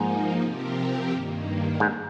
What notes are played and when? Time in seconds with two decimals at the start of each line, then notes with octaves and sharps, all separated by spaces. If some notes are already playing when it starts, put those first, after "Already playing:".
Already playing: G#2 F3 A#3 D#4
0.41 C3 F3 C4 G4 A#4
1.10 G2 D#3 A#3
1.80 G#2